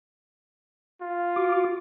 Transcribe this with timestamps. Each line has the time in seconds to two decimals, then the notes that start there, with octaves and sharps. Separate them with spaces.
1.02 F4
1.36 F#4 D6